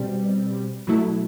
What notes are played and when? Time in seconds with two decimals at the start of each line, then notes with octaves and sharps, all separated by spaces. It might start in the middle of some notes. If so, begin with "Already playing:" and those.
Already playing: B2 G3 C4
0.87 B2 F#3 A3 E4